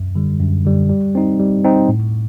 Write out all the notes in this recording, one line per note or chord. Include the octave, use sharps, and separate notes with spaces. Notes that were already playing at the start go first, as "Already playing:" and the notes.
Already playing: F#2
D3 G3
F#2
D3 G3
G3
C4 D#4
G3
C4 D#4
A2